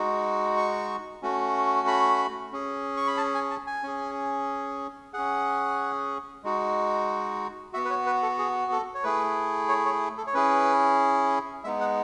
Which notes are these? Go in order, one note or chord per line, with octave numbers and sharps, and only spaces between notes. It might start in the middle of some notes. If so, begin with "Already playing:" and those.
Already playing: G#3 D#4 F#4
C#6
A3 C#4 F#4
B5
C#4 G#4
C#6
B5
A5
G#5
A5
G#5
C#4 G#4
C#4 G#4 F#5
G#3 D#4 F#4
B3 F#4 E5
B4
C#5
B4
A4
G#4
A4
C#5
A3 E4 G#4 B4
C#5
C#5
A4
C#5
C#4 E4 G#4 B4
G#3 B3 D#4 E5
F#5